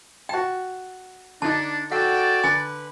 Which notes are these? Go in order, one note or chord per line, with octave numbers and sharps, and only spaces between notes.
F#4 G5 A5
D3 D4 D#4 A5
F#4 A4 D5 F#5 G5
D3 B4 G#5